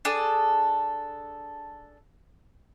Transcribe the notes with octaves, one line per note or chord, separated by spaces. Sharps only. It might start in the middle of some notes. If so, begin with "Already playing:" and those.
D4 G#4 A4